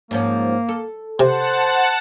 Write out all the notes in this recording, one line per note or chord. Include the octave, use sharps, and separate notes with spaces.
G#2 F3 A#3 C#4
A4
C3 C5 F#5 A5